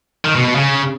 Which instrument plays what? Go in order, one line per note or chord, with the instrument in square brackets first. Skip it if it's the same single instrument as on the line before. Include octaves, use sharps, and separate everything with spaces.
[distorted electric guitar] D#3
B2
B2
C#3